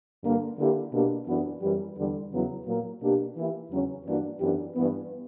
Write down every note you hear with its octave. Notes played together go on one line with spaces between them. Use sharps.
G2 D3 A#3
D3 A#3 E4 G4
B2 A#3 D4 G4
F#2 E3 B3 D4 F#4
F#2 E3 G3
E2 D3 G3
E2 C#3 F#3 B3 E4
A#2 F#3 A#3
B2 A#3 D4 G4
E3 A#3 E4 G4
E2 C#3 F#3 C#4
G2 E3 A#3 D4 F#4
F#2 E3 B3 D4 G4
G2 E3 B3